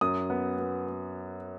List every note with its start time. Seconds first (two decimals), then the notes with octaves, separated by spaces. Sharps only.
0.01 F#2 D#6
0.30 B3
0.58 B3
0.87 B3